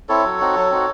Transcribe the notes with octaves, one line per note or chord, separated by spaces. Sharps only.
C4 E4 A4 C#5
F#3
C4 D#4 F#4
F#3
C4 D#4 F#4